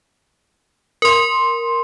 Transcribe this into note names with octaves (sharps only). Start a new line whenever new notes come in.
A#4 C6